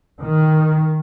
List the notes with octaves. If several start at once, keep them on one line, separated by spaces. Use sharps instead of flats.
D#3